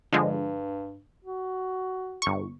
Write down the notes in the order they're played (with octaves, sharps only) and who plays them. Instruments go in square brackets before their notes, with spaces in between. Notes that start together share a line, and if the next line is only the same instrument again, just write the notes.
[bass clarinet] G2 [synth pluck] D3 F3 G#3
[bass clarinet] F#4
[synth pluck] G1 C#6